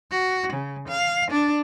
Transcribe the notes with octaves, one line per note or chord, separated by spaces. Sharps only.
F#4
C#3
F5
D4